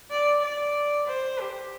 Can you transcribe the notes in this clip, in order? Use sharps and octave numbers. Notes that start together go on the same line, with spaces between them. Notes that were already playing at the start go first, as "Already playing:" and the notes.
D5
D5
C5
G4